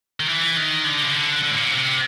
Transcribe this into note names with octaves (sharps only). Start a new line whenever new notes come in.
D#3
E3
D#3
D3
C#3
D3
D3
A2
A#2
B2
C3